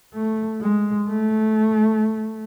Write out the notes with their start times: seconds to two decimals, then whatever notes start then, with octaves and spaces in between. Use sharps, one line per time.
0.14 A3
0.61 G#3
1.08 A3